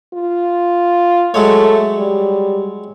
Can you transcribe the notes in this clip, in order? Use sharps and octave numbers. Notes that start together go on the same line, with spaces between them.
F4
F#3 G#3 A3 C#5
G3